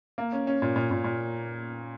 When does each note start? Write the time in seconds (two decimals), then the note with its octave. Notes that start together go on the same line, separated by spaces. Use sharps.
0.18 A#3
0.33 C#4
0.47 C#4
0.62 A#2
0.76 A#2
0.91 A#2
1.04 A#2